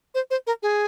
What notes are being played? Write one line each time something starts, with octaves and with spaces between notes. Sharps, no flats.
C5
C5
A#4
G#4